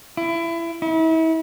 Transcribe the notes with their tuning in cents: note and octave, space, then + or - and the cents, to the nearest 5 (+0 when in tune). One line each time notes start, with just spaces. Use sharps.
E4 +25
E4 -35